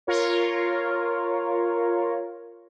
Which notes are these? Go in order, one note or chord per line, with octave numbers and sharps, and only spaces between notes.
F4 A#4 C#5